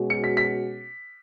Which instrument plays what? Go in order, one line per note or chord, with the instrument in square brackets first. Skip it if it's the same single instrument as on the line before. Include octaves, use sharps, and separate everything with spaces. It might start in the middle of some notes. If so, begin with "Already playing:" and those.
Already playing: [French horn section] B2 G#3 C#4 F#4
[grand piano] C#7
B6
B6